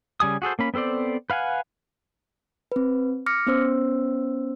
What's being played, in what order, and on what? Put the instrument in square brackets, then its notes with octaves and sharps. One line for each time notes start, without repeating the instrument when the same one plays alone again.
[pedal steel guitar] C#3 G3 G#5 D#6
F#4 G#4 A4 C5
A#3 C#4 B5
B3 C4 A4 C5 D5
B4 F5 F#5 G#5
[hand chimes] C4 B4
D6 F6 A#6 C#7
B3 C#4 C5 E6